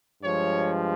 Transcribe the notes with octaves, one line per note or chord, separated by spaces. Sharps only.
G2 F3 G#3 C#5